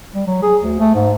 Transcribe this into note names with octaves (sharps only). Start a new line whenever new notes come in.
G3
F#3
G#4
D2
A3
G#2